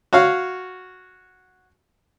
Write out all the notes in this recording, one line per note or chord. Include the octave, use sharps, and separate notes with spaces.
F#4 C#5 F5